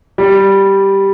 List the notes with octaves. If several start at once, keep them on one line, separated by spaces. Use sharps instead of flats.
G3